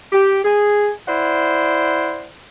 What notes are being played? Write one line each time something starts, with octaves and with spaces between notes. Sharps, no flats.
G4
G#4
E4 C5 D5 F#5